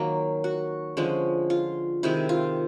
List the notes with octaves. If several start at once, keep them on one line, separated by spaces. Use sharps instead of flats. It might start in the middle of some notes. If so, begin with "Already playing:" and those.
Already playing: D#3 F#3 A#3
F#4
D3 F3 G#3 C#4
F4
C3 D#3 G#3 E4
F4